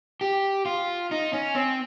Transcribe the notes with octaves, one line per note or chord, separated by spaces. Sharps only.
G4
F4
D#4
C#4
C4